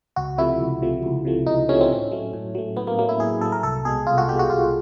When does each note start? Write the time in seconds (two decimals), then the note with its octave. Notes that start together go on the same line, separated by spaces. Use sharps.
0.16 C#2 F#4
0.38 C3 F3 A3 E4
0.60 C#2
0.82 C3 F3 A3
1.03 C#2
1.25 C3 F3 A3
1.47 C#2 D#4
1.69 C3 F3 A3 C#4
1.81 C4
1.90 A2 C#4
2.11 F#3 A3
2.33 A2
2.55 F#3 A3
2.77 A2 B3
2.87 A#3
2.99 F#3 A3 A#3
3.09 E4
3.20 A2 G#4
3.41 F#3 A3 A4
3.52 A#4
3.63 C2 A4
3.85 B2 G#3 G#4
4.06 C2 F4
4.18 F#4
4.28 B2 G#3 G4
4.39 F#4
4.50 C2 F4